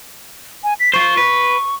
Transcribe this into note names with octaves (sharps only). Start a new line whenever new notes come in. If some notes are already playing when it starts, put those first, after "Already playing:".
G#5
B6
F4 C5 C#6
B4